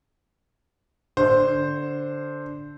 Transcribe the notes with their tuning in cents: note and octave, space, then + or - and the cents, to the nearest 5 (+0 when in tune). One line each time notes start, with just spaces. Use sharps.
D3 -5 C5 +0